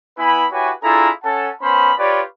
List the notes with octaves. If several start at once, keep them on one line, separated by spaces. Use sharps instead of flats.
B3 E4 B4 G#5 B5
E4 F#4 G4 B4 C#5 G#5
D4 E4 F4 G#4 A4 A#5
C#4 A4 F#5 A5
B3 C#4 C5 B5
F4 G4 B4 C#5 D5